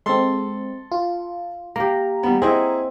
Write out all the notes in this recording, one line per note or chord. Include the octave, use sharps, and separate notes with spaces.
G#3 C4 A4 C6
F4
A#3 G4 A#5
G3 B3
C4 E4 G#4 D#5 F#5